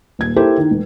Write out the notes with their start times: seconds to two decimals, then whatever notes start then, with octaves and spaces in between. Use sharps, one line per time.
0.19 D#1 G#6
0.36 E4 G4 A4 A#4 C5
0.58 D#3
0.71 E1